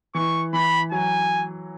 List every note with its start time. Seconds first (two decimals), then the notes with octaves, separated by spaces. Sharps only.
0.15 E3 C#6
0.53 E3 B5
0.92 F#3 G#5